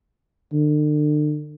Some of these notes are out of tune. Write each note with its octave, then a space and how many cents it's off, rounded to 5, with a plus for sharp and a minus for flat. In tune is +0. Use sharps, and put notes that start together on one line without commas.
D3 +40